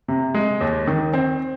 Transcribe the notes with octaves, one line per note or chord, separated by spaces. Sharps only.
C3
G#3
D#2
D#3
C4